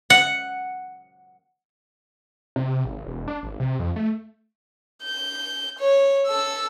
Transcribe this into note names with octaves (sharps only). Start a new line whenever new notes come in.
F#5
C3
G#1
E1
D4
G#1
C3
F2
A3
G6
C#5
A4 E6